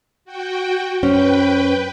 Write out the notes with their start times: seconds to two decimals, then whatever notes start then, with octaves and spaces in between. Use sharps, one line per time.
0.25 F#4 G5
1.03 F#2 C#4 B4 C5 G5